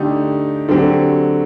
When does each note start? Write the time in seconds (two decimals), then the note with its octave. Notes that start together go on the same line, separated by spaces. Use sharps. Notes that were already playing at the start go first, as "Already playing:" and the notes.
Already playing: D3 A3 D#4 G4
0.69 D3 F#3 C4 G4